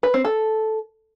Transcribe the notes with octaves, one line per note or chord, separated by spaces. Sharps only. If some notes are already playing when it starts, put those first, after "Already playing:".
B4
C4
A4